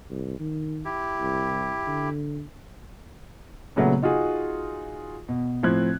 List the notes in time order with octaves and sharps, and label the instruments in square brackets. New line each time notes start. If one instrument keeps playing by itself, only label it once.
[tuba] C2
D#3
[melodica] E4 G4
[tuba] C2
D3
[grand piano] A#2 C#3 F#3 A3 B3
D#4 F4 F#4 G#4
B2
A2 F3 C4 F#6 G#6